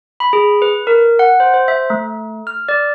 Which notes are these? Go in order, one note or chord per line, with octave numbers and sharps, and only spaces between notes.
B5
G#4
B4
A#4
F#5
C5
C5
E5
A3
F6
D5